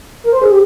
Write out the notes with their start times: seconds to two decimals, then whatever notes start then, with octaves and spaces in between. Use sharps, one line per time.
0.24 A#4
0.32 C5
0.42 G#4
0.50 G4